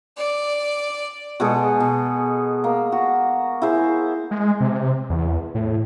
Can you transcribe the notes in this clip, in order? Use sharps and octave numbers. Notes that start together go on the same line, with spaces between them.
D5
B2 G#3 G#4 A4
B2
A#3
F#4
E4 G#4 C5
G#3
C3
E2
A2